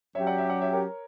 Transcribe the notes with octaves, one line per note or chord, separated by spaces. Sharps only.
F#3 C#4 G4 C#5 E5
D5 F#5
C#5 E5
D5 F#5
C#5 E5
A#4 C#5